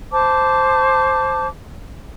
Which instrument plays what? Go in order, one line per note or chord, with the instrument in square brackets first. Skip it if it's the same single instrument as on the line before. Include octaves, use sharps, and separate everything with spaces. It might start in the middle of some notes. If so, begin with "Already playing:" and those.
[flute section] C5 A5 D6